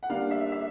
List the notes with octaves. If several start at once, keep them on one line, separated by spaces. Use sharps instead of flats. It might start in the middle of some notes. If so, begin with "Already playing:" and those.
F#5
D3 G3 A#3 D4 F5
E5
E5